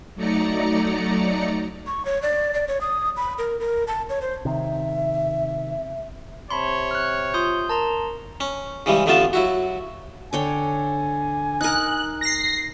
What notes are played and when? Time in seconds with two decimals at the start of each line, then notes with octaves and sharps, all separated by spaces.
0.15 F#3 A3 D#4 D5 A#5 C#7
1.87 C#6
2.05 C#5
2.22 D5
2.54 D5
2.68 C#5
2.81 D#6
3.17 B5
3.38 A#4
3.60 A#4
3.87 A5
4.09 C#5
4.22 C5
4.45 C3 D#3 E5
6.51 C3 C#5 A5 B5 C6
6.91 F6 F#6
7.34 F4 C6 D#6 G6
7.69 A#4 A5 A#5 C6
8.40 C#4
8.86 C#3 E3 G3 G#3
9.06 A1 D3 A3 B3 F4 A5
9.33 F#3 E4 F#4
10.33 D3 C#5 G5 G#5
11.61 D#4 A#4 F#6
12.21 A#6 C7